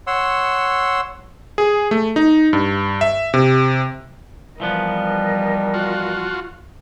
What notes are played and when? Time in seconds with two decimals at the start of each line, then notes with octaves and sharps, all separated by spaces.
0.07 C#5 F#5 C6 E6
1.58 G#4
1.91 A3
2.16 D#4
2.53 G2
3.01 E5
3.34 C3
4.60 E3 F3 G3 B3 A#4 D#5
5.74 F4 F#4